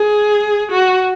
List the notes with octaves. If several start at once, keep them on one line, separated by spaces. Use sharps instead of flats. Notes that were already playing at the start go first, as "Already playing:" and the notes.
Already playing: G#4
F#4